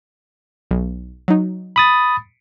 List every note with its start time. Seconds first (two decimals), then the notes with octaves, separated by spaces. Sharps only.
0.71 B1
1.28 F#3 D#4
1.76 B5 D#6 A6